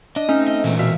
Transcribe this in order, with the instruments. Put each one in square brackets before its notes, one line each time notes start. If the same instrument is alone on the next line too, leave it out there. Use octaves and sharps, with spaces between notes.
[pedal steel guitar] D4 [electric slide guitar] D#5
[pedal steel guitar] A3 C4 [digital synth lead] C#4 [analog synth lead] D#4
[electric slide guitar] D#5
[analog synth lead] A#2 [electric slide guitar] E3 F#4
[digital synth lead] B2 [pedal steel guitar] C4 E5 F5